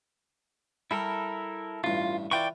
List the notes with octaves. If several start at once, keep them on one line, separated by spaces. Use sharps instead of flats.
G3 E4 A4 A#4
A1 G2 F4
E3 F4 D5 G5 C#6